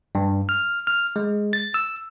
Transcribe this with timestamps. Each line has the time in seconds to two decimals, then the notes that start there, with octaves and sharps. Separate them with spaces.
0.15 G2
0.49 F6
0.87 F6
1.16 G#3
1.53 A6
1.74 E6